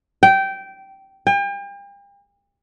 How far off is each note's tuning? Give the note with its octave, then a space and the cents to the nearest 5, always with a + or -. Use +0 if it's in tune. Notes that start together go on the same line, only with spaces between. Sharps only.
G5 -15
G5 +40